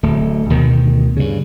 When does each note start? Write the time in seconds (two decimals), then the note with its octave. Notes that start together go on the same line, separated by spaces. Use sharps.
0.03 D1 D2 A3
0.50 D2 B2 D#3
1.17 G2 C#3